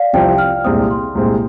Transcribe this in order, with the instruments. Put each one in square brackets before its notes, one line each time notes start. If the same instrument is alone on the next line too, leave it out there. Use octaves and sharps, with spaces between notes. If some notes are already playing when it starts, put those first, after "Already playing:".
Already playing: [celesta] D5 F5
[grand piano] C2 C3 F3 C4 [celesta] G5
[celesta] F6
[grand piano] C2 A#2 G#3 C4 [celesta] D#6
[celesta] C6
[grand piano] C2 A#2 G#3 C4